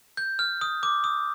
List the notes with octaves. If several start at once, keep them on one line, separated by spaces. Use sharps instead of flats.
G6
F6
D#6
D6
D#6